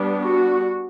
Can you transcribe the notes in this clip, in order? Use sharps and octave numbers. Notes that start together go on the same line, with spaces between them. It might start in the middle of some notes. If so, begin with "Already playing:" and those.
Already playing: G3 B3 D4
F#4